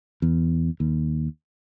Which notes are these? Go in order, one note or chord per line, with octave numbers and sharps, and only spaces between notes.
E2
D#2